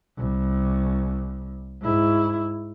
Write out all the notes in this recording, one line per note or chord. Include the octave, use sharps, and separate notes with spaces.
C2
G#2 E4